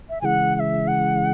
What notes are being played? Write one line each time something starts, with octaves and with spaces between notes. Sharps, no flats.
E5
C#3 E3 G#3 F#5 G#5
F#5
E5
F#5